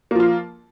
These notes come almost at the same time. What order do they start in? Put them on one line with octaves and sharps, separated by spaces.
A#3 F3 F4